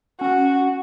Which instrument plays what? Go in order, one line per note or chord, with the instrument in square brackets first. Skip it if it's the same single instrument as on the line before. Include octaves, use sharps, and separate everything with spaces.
[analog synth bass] C#4 [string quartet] F#4